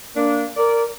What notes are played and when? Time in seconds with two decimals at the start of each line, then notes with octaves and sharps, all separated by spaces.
0.16 A#3 D4
0.55 A#4 D5